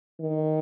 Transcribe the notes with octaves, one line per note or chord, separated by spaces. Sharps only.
D#3